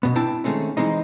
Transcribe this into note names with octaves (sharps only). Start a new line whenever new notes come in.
B2 B3
C4 D4 E4 G5 A5
D#3 G#3 A3 C4 C#4
E3 G#3 C4 D#4